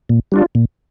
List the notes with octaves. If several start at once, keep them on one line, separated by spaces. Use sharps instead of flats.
A#2
G3 D4 F4
A#2